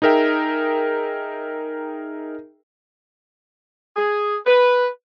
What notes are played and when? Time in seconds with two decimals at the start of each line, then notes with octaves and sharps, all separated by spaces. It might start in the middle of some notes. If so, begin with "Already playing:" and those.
0.02 D#4 G#4 A#4 E5 G5
3.96 G#4
4.47 B4